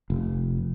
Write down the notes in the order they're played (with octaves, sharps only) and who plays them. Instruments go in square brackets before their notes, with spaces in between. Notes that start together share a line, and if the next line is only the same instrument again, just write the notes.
[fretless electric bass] F1